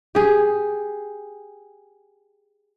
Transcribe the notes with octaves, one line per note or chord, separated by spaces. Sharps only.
G4 G#4